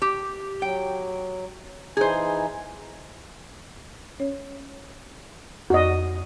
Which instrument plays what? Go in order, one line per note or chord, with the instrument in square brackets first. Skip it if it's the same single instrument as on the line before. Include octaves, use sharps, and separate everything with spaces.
[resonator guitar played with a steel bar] G4
[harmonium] F#3 [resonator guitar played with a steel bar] G5
[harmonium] E3 D#4 G#5 [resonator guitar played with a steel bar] G#4 C5
[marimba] C#4 C#5
[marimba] F2 D5 [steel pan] F#4 D#5